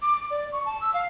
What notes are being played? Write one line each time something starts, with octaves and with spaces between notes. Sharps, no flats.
D6
D6
D5
C#6
A5
E6
F5